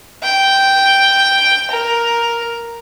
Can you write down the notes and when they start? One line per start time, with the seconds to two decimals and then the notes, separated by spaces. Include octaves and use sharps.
0.23 G5
1.71 A#4